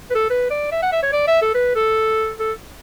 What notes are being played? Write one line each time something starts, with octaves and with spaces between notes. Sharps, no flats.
B4
A4
B4
D5
E5
F#5
E5
C#5
D5
E5
A4
B4
A4
A4